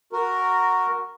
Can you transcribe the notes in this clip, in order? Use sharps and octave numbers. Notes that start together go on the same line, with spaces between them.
F#4 A#4